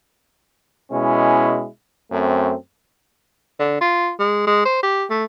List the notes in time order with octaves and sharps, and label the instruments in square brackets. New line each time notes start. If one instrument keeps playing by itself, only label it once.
[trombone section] B2 G#3 C#4 E4
F#2 A3 C4
[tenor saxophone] D3
F4
G#3
G#3
C5
G4
A3